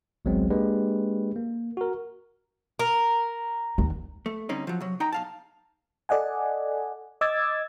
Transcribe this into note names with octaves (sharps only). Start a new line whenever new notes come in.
G#1 C#2 F#3 G#3 B3 C4
G#3 A#3 D4 G4 B4
A#3
F#4 A#4
A#4
D#2
A3
D3 G3 C4 C#4 D#4
F3 F#3
C3 F#3
D#4 G5 A#5
B1 F5 A5
A4 D5 D#5 F#5 G#5
D#5 D6 E6 G#6 A6